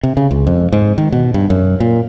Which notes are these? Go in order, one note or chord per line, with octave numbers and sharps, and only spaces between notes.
C3
C#3
C#2
F2
G#2
D#3
B2
G2
F#2
A#2